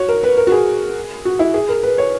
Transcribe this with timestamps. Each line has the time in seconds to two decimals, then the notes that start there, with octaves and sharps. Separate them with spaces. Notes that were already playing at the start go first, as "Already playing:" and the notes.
Already playing: F#4 C#5
0.08 A#4
0.23 B4
0.37 A#4
0.47 F#4
0.52 G#4
1.25 F#4
1.39 E4
1.54 G#4
1.69 A#4
1.83 B4
1.98 C#5